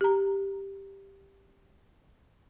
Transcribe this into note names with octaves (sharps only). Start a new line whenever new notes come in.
G4 A#5